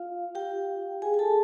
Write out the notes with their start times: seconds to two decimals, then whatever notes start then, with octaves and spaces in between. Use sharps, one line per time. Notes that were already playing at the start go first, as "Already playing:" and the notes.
Already playing: F4 F5
0.35 G4 G5
1.02 G#4 G#5
1.14 G#5
1.19 A4 A5